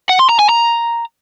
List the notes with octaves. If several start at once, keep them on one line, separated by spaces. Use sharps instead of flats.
F#5
C6
A#5
G#5
A#5